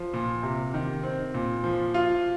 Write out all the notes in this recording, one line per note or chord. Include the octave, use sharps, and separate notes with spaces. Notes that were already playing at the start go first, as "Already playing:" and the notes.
Already playing: F3
A#2
C3
D#3
C4
A#2
F3
F4